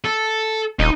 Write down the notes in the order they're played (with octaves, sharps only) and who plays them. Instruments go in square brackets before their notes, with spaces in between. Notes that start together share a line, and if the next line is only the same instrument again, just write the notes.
[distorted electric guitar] A4
[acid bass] D#1 [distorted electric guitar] D#4